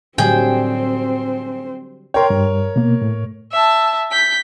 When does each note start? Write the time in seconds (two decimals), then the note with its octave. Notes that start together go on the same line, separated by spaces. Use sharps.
0.18 A2 D3 F#3 G3 C4 G#4 C5 G5
2.14 A#4 C#5 G5 C6
2.30 G2
2.76 B2 A#3
3.02 A2
3.52 E5 A5
4.11 G6 B6